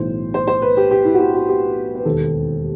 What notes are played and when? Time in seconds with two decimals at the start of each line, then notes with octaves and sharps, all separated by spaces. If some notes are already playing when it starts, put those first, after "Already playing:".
Already playing: B1 A2 E3 C5
0.34 C5
0.48 C5
0.62 B4
0.77 G4
0.91 G4
1.05 E4
1.14 F#4
1.19 G4
1.34 F#4
1.48 G4
1.95 B4
2.05 E1 D#2 D#3 A4